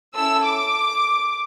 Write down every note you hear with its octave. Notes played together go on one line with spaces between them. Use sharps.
C#4 E4 A4 E6
D6